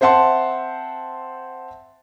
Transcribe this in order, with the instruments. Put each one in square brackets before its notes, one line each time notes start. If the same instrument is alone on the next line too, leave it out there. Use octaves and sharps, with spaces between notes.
[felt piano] C4 C5 E5 F#5 A5 C6